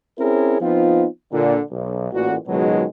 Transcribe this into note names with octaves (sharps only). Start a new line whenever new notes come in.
C4 C#4 E4 G#4 A#4 C#5
F3 B3 C4 D#4 F4
A#2 D3
B1
A1 A#2 F#4
C#2 G#2 B2 D#3 F#3 G#3